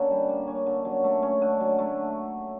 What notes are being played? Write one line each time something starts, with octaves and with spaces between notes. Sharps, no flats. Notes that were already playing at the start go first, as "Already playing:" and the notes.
Already playing: D3 A#3 C#4
G3
A#3
C#4
D3
F#3
A3
C#4
D3
F#3
A3